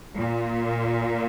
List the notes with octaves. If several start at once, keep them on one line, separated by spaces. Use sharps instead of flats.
A#2